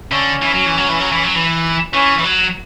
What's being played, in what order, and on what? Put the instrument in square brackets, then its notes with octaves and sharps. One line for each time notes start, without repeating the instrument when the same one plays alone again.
[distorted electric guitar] D3 [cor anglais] C#4
[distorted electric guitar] E3
F#3
E3
F#3
E3
F#3
E3
F#3
E3
[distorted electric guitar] E3 [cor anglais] C#4
[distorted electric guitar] E3
F#3